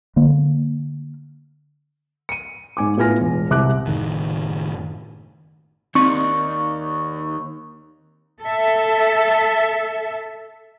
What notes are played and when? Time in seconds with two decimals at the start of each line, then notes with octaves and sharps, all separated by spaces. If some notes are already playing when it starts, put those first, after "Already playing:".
0.16 D3 A#3
2.29 C#7 D#7
2.77 G#2 G#5 D6
2.97 A2 B3 F4 G#5 F6 A#6
3.21 E1
3.50 C2 C3 D6 F#6
3.86 F#1 A2 D#3
5.95 D#2 C4 D#4 D5 C#6
8.42 A4 E5